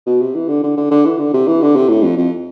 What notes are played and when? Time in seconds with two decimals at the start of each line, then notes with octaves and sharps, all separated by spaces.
0.07 B2
0.21 C3
0.35 E3
0.48 D3
0.63 D3
0.77 D3
0.91 D3
1.05 E3
1.18 D3
1.34 C3
1.47 E3
1.62 D3
1.76 C3
1.89 A2
2.03 F2
2.17 F2